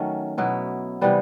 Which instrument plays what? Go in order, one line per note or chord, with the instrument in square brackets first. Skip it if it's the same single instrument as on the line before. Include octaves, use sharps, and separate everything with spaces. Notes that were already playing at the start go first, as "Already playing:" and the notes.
Already playing: [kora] D#3 F#3 A3 C#4
B2 F#3 B3 E4
C3 E3 G3 B3